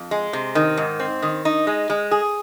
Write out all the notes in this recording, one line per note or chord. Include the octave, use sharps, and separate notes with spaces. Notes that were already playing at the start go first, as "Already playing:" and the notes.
Already playing: F2
G#3
C3
D#3
G#2
C4
D#3
D#4
G#3
G#3
G#4